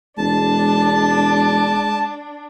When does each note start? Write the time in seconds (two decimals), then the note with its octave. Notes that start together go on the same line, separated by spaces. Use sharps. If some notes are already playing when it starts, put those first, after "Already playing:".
0.18 E1 G#3 D4 A5